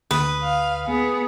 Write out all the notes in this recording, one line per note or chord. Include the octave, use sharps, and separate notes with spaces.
D2 B4 D#6
F5
B3 G#4